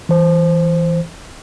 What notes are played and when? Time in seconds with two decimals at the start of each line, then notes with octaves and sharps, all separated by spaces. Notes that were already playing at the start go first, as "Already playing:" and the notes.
0.09 E3 C5